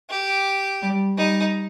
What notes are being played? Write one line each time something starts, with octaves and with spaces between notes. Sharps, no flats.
G4
G3
G3 D#4